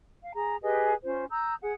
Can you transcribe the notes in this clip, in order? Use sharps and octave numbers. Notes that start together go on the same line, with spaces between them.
F5
G#4 A#5
G4 G#4 B4 D#5
C#4 F4 C5
A#5 D#6 E6 G6
G#4 F#5